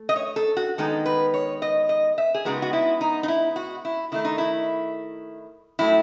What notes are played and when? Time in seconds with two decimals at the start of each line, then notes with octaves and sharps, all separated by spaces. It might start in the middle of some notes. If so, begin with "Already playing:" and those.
Already playing: A3
0.09 D#5
0.16 C#5
0.36 A4
0.57 F#4
0.78 D#3 G#3 B3 D#4 A4
1.06 B4
1.34 C#5
1.62 D#5
1.89 D#5
2.18 E5
2.34 G#4
2.45 C#3 G#3 B3 D#4 F#4
2.62 F#4
2.73 E4
3.01 D#4
3.23 D#4
3.28 E4
3.56 F#4
3.85 E4
4.12 D#3 A3 D#4 E4
4.25 D#4
4.38 E4
5.79 A2 F#3 A3 E4